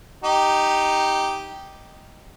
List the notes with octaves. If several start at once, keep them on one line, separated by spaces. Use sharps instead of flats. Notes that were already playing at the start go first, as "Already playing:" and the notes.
D#4 G4